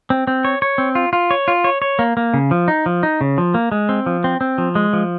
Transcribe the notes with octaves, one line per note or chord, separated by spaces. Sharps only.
C4
C4
C#5
C#5
C4
F4
F4
C#5
F4
C#5
C#5
A#3
A#3
C#3
F3
D#4
F3
D#4
C#3
F3
A#3
G#3
C4
F3
C4
C4
F3
G#3
F3